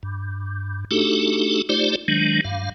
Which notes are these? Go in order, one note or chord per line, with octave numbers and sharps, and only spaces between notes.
G2
A3 D4 D#4 F#4 G4 A4
A3 D#4 F4 G4 C5 D5
D#3 F#3 G#3 D4
G2 F5